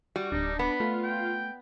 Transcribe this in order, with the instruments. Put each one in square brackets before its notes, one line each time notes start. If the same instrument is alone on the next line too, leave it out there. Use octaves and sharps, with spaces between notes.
[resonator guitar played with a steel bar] G3 [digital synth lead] F#4
[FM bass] D1 [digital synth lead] D4 [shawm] D#4
[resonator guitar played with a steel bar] B3 [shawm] B5
[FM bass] A3 [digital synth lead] F4
[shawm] G5